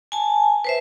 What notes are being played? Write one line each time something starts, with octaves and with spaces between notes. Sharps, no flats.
G#5 A5
B4 C5 E5